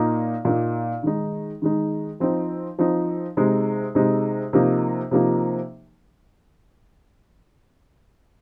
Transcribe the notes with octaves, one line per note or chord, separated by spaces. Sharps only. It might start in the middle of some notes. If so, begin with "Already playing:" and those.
Already playing: A#2 A#3 D#4
A#2 A#3 D#4
D#3 G#3 D#4
D#3 G#3 D#4
F3 C4 D#4
F3 C4 D#4
C3 G#3 D#4
C3 G#3 D#4
C3 F3 A#3 D#4
C3 F3 A#3 D#4